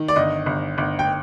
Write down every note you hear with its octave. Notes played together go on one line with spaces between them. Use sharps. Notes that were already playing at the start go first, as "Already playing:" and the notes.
Already playing: D#3
D5
G1 D#5
G1
G1
G5